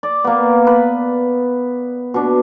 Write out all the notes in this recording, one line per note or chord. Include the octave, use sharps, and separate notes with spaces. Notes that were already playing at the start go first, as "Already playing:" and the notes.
D5
A#3 B3
B4
B2 D4